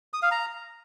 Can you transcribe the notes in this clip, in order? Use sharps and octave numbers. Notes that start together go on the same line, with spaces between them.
D#6
F5
A#5